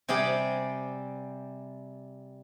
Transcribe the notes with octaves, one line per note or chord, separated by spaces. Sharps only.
C3 G3 G#4 D5 G5